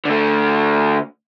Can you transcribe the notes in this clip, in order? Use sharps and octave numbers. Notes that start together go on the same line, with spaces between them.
D3 A3